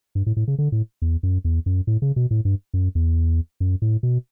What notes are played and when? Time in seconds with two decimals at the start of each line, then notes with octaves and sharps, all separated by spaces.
0.15 G2
0.26 A2
0.37 A2
0.48 C#3
0.58 D3
0.72 A2
1.02 E2
1.23 F#2
1.45 E2
1.66 F#2
1.87 A2
2.02 C#3
2.16 B2
2.31 A2
2.45 G2
2.74 F#2
2.95 E2
3.60 F#2
3.82 A2
4.03 B2